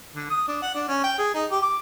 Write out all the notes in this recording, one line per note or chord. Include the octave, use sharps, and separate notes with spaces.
D3
D#6
D4
F#5
D4
C#4
G5
G#4
D#4
G4
D6